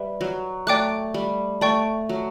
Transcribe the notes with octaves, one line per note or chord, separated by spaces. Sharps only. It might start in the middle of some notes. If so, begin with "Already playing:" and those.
Already playing: G3 B4 E5
F#3
A3 D5 G5 D6 F#6
G3
A3 D5 G5 C#6
F#3